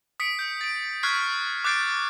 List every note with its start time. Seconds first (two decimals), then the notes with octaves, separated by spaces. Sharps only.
0.20 D#6 B6 C#7 D7
0.39 G6
0.61 A6 D7
1.03 C#6 F6 F#6 G#6 B6 C7
1.64 D6 F#6 G6 A6 C7 D7